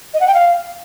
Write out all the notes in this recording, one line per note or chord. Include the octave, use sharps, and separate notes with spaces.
D#5
F#5
G5
F5